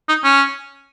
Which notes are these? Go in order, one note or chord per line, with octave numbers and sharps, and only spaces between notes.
D#4
C#4